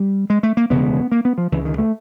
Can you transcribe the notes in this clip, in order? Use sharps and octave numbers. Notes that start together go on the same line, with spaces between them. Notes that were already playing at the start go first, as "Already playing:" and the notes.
Already playing: G3
G#3
A3
A#3
E1 D2 C#3 B3
A#3
B3
F3
C#2 C#3 E3
D#3
A3